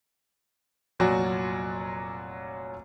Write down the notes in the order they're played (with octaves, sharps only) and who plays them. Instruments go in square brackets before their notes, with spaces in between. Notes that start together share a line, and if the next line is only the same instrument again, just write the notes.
[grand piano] F1 A#2 F#3 F#4 D5 G#5